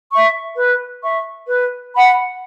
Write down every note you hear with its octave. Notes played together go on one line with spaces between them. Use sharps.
E5 C#6
B4
E5 C#6
B4
F#5 B5